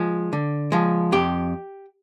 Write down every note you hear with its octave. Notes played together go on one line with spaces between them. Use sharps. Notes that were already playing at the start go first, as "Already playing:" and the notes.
Already playing: F3 G#3
D3
F3 G#3
F2 G4